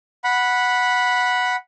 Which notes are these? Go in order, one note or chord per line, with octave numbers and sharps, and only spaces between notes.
F#5 B5